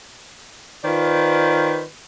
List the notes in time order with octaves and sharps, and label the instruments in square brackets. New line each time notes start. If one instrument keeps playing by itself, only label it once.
[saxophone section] D#3 F4 B4 C5 D5